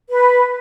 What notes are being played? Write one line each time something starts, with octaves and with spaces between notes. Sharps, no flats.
B4